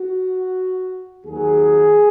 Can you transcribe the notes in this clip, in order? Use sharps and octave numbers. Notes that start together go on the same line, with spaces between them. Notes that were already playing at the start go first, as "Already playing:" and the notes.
Already playing: F#4
D#2 D#3 F#3 G#4